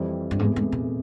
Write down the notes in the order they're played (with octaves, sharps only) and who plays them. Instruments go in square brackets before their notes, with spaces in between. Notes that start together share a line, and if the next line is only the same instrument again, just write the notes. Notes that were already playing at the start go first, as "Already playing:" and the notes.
Already playing: [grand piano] F2 E3 G3 C4
[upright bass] G2
[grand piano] F1 E2 C3 [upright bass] G#2
[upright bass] G#2
A#2